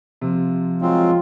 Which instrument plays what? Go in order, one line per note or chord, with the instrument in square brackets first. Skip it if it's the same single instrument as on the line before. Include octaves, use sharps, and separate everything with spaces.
[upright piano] C3 [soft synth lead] F3
[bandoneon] F#3 G#3 C4 [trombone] F4